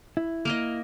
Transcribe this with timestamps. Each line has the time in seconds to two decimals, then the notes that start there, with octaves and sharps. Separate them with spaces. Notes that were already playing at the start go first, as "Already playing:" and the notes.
0.17 E4
0.45 A#3 A#4 D#5